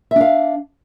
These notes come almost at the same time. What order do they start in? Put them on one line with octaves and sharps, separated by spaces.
E5 D4 F5